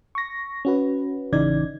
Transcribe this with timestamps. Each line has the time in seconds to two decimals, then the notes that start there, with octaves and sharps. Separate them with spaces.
0.15 C#6 A#6
0.65 C#4 F#4 B4
1.32 A1 C#3 E3 D#4 D5 G#6